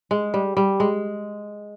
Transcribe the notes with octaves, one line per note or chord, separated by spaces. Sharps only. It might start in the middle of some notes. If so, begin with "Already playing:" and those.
G#3
G3
G3
G#3